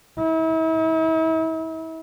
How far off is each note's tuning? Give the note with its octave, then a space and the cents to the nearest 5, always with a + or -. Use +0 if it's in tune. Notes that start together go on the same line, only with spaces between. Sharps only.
E4 -40